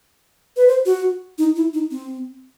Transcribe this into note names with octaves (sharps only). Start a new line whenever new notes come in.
B4
C5
F#4
D#4
E4
D#4
C4